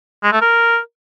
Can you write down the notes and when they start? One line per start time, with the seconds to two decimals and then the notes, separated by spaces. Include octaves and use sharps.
0.23 G#3
0.32 A3
0.41 A#4